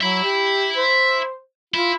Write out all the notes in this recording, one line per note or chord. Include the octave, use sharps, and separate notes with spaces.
F#3 E5 B5
G4
C5
E4 F4